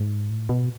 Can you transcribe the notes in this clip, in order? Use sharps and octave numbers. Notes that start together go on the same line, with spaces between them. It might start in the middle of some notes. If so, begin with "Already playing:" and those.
Already playing: G#2
A2
B2